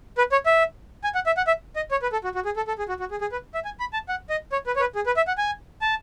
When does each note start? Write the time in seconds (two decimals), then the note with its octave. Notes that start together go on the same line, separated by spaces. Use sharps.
0.18 B4
0.32 C#5
0.46 E5
1.04 G#5
1.15 F#5
1.26 E5
1.37 F#5
1.47 E5
1.76 D#5
1.91 C#5
2.02 B4
2.12 A4
2.24 F#4
2.35 F#4
2.45 G#4
2.56 A4
2.68 A4
2.79 G#4
2.89 F#4
3.00 F#4
3.11 G#4
3.21 G#4
3.32 B4
3.55 E5
3.65 G#5
3.80 B5
3.93 A5
4.09 F#5
4.30 D#5
4.52 C#5
4.67 B4
4.76 C#5
4.80 B4
4.95 G#4
5.06 B4
5.17 E5
5.28 F#5
5.38 G#5
5.82 A5